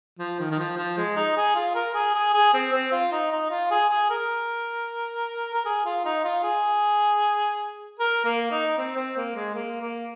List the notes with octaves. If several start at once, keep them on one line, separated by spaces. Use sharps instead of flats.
F3
D#3
D#3
F3
F3
G#3
D#4
G#4
F4
A#4
G#4
G#4
G#4
C4
C4
F4
D#4
D#4
F4
G#4
G#4
A#4
A#4
G#4
F4
D#4
F4
G#4
A#4
A#3
D#4
C4
C4
A#3
G#3
A#3
A#3